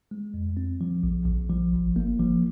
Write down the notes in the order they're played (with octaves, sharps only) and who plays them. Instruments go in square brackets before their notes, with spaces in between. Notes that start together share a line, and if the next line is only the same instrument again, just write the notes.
[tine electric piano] G#3
F2
C4
F3
A#1
A#1
F3
G1
A#3
F3